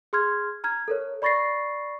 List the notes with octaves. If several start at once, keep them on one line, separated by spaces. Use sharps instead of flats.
G#4 C6 F6 G#6
A#5 F6 G#6
A4 A#4 C#5
D5 B5 C#6 A6 A#6 C7